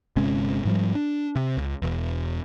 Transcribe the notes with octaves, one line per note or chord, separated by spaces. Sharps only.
G1 C3 G#3 C#4
G#2 F3 G3
D4
C3
C#2
E1 E2